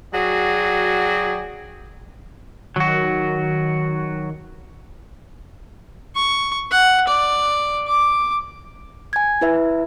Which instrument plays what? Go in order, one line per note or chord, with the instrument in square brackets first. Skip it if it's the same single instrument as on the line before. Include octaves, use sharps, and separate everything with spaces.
[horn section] F#3 F#4 G#4 D5 G5
[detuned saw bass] D#3 [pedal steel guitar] F#3 F#4
[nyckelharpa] C#6
F#5
D5
D6
[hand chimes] G#5 G#6
E4 B4 E5